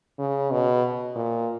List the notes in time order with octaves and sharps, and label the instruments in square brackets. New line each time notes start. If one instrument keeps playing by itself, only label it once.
[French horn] C#3
B2
A#2